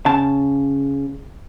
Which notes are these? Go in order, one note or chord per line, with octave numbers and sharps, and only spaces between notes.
C#3 A5